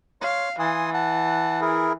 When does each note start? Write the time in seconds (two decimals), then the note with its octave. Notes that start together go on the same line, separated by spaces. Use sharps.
0.21 C#5 F5 C6
0.59 E3 G#5 C6 D#6
0.94 F#5 A5
1.61 E4 G#4 A#4